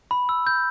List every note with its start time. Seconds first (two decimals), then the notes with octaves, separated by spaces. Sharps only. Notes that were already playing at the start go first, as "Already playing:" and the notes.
0.11 B5
0.29 E6
0.47 G6